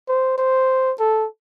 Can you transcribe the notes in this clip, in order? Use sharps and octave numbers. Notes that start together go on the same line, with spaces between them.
C5
C5
A4